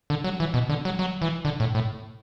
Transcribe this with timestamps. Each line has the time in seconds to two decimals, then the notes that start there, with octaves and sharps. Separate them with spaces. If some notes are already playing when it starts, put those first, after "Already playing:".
0.10 D3
0.24 F#3
0.40 E3
0.54 B2
0.69 D3
0.85 F#3
0.99 F#3
1.22 E3
1.45 D3
1.60 A2
1.75 A2